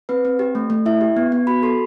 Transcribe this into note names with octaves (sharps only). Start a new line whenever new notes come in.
C4 B4
C4
G4
A3
A3
E4 E5
G4
B3
B3
F#4 B5
A4 C6